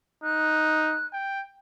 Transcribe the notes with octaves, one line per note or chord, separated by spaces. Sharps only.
D#4 F#6
G5